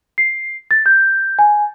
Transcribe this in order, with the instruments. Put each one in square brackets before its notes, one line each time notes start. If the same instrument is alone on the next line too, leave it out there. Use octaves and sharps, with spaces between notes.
[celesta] C7
A6
G6
G#5